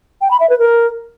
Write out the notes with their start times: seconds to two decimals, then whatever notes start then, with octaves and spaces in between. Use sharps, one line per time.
0.21 G5
0.31 B5
0.40 E5
0.50 B4
0.59 A#4